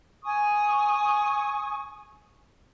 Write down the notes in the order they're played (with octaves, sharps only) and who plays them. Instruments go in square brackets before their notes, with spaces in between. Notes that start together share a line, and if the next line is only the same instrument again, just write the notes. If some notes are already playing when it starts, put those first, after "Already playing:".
[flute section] G#5 C#6 D#6